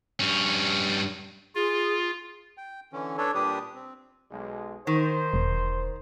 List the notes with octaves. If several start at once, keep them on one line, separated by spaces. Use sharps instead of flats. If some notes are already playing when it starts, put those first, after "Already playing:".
G2 C#4
F4 G#4
G5
D3 E3 C#4
D4 A4 B4 C#5
A#2 G3 D4 G4 B4 D#6
C4
B1 G#3
D#3 C5
E1